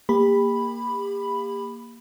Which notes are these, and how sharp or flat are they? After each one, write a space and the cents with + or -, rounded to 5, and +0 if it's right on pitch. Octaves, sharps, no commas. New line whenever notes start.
A#3 +0 G4 +35 B5 +0